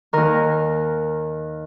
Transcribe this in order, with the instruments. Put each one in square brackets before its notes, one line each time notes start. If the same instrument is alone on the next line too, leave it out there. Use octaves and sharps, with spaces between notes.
[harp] D#2 D#3 A#4